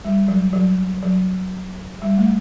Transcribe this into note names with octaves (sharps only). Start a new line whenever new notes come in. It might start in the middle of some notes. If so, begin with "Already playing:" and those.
G3
F#3
F#3
F#3
G3
A3